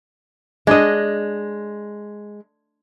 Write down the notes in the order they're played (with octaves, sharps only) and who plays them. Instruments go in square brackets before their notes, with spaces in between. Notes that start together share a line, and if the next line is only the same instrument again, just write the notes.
[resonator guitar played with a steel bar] G#3 [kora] D4 D#5